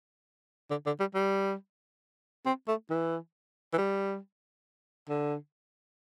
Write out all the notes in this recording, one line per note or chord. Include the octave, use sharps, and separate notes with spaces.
D3
D3
G3
G3
C4
A3
E3
E3
G3
D3